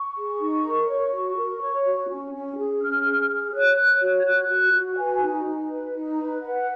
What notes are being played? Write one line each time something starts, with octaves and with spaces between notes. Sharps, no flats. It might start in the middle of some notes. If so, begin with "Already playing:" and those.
Already playing: C#6
G#4
D#4
A#4
C#5
F#4
A#4
C#5
F#4
C#4
C#4
G#4
C#4 F6
G#4
G#4
C#5 F#6
C#5
F#4
G#6
F#4 F#6
F#4
F#4
F#5
B4 G#5
D#4
D#4
B4
D#4
B4
B4 F#5